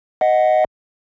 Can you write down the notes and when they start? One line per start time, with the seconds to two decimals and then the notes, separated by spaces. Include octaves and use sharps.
0.21 D#5 F#5